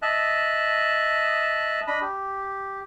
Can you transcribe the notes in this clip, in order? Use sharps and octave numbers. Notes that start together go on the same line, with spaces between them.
D#5 E5 A5 F#6
D4 D#5 B5
G4